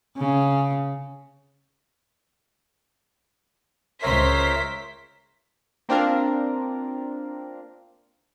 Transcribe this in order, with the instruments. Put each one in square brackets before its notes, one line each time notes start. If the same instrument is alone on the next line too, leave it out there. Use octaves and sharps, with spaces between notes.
[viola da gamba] C#3
[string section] C#2 C5 B6 [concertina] A#4 C#5 E5
[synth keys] A#3 C4 D4 F4 A#4